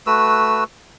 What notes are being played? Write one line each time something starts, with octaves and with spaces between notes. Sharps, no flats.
A3 F#4 B4 E6